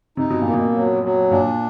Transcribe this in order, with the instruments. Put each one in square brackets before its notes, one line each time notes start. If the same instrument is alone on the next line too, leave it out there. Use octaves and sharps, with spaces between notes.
[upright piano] C3 [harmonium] D#4
[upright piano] B2
[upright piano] A#2 [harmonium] A#3
[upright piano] B2
[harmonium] F#3
F#3
[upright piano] A#2 [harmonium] D4